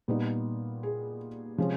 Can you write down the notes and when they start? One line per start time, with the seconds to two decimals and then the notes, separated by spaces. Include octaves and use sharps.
0.08 A#2 G3 B3 D#4
0.83 G#4
1.58 C3 F3 G#3 C#4